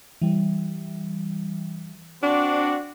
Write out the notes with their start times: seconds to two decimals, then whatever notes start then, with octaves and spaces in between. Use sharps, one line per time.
0.21 E3 G3
2.21 C4 D4 F#4